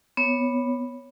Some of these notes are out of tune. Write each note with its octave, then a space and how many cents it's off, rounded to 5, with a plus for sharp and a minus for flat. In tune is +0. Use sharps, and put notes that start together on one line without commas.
B3 +0 C#5 +0